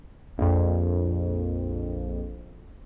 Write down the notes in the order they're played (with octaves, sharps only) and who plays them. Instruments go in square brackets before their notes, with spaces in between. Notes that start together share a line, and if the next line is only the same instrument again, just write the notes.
[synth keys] A#1 F2